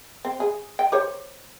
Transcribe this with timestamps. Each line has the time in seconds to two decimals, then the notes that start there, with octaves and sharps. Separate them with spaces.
0.25 C4
0.40 G#4
0.79 G5
0.92 G4 C5 C#5